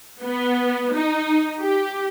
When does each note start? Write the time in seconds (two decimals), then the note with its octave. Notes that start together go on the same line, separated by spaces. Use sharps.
0.23 B3
0.95 D#4
1.62 G4